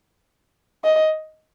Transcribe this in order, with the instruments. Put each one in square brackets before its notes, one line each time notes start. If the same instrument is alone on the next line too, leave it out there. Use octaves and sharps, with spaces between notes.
[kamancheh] D#5